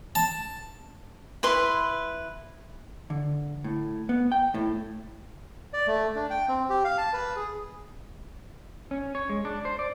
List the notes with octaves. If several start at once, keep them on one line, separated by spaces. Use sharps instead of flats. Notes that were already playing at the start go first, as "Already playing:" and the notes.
A5
E4 B4 C6
D3
A2
B3
G5
A2
D5
A3
D4
G5
C4
G4
F5
A5
B4
G#4
C#4
C#5
G#3
D4
C5
D5